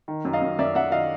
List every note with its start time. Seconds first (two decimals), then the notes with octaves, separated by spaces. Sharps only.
0.08 D#3
0.25 F#2
0.33 D#5 F5
0.42 F#2
0.59 F#2 D5 E5
0.75 F#2 E5 F#5
0.92 D#3 D#5 F5